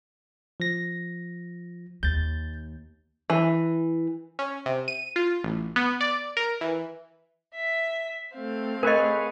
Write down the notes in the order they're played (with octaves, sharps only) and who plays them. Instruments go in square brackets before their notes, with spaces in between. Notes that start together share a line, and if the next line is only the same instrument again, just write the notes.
[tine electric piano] F3 A#6
[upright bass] D#2 [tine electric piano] G6 A6
[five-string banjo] E3
[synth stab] C#4
C3
D#7
F4
A1
B3
D5
A#4
E3
[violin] E5 B6
[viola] A3 C4 [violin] F5
[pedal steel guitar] G#4 B4 C#5 [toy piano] A#4 D#5